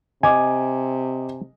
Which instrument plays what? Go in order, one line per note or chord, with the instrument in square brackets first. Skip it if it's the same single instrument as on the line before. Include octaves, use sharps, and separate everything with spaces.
[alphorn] C3 [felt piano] D#5 D6 [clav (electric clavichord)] G#5